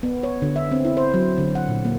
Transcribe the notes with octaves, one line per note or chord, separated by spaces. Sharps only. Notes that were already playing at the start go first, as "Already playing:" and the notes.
B3
C#5
D3
E5
C4
E4
C5
F#3
D3
F#5
A#2
A#3